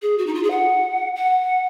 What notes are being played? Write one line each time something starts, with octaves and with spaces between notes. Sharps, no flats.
G#4
F#4
D#4
F4
G#4
F#5
F#5